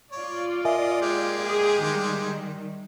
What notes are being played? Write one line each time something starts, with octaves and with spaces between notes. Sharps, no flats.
F4 C#5 D5
A#4 D#5 E5 G#5
G#3 A#3 G4
G#4
D#3 G3